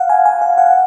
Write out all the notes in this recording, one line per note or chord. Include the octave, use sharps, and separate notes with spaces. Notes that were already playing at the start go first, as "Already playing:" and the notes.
Already playing: F5 F#5
G#5
G#5
F5
F#5